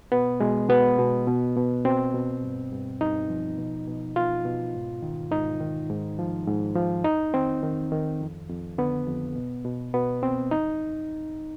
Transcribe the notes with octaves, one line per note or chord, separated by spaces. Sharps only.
B2 B3
B2 G#3
B2 B3
B2
B2
B2
B2 C4
B2
G2
G2
G2 D#4
F3
B2
B2
B2 F4
B2
G#2
D#3
G#2 D#4
D#3
G#2
F3
G#2
F3
F2 D#4
D#3 C4
D#3
D#3
F2
F2
D3 B3
F2
B2
B2
B2 B3
B2 C4
F2 D#4